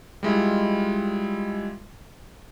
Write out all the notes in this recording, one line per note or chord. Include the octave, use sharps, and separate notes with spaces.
G3 G#3 E4 F4